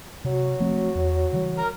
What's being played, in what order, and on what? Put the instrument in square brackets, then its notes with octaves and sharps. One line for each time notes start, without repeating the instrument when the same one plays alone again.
[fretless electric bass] C3 [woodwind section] F#3 F#4
[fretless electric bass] F3 A3 C4
E2
C#3 E3 G3
[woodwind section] A#4